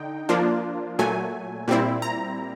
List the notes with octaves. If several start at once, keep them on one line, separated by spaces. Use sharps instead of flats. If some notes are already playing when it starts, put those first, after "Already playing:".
Already playing: D3 D#4 G5
F3 A#3 D4 F4
A#2 F#3 A3 G#5
A#2 G3 C4 E4
A#5